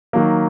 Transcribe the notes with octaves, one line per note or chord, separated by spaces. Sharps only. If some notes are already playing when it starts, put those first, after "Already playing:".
D#3 F#3 A#3